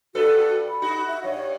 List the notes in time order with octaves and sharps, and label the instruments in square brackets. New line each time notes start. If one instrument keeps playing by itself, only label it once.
[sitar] G2 A4 B4 [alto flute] F#4
[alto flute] B5
[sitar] D#4 F#4
[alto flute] E5
[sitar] G2 [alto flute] C#5